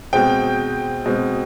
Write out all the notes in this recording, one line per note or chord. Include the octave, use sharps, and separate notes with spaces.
B2 G#3 C4 G5
B2 G#3 C4